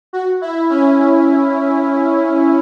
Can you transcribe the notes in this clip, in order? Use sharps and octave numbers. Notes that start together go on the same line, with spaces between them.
F#4
E4
C#4